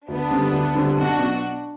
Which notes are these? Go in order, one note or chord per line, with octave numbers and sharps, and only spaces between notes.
D2 B3 D4
D3 G3 C4
D2
D3 G3 C4
B1 D4 F#4
B2 F#3